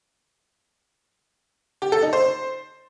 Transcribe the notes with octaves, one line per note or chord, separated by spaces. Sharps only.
G4
A4
D#4
C5